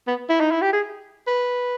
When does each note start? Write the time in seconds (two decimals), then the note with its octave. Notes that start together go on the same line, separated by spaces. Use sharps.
0.07 B3
0.29 E4
0.40 D#4
0.51 E4
0.62 G4
0.73 G#4
1.27 B4